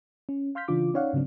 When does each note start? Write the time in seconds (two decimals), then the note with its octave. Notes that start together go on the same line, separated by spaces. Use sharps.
0.29 C#4
0.55 F5 C6 F6 G6 B6
0.68 C#3 E3 D4 F4 D6
0.94 C#4 D#4 C#5 D5 F5 F#5
1.13 G#2 C#3 F#3 C4 D4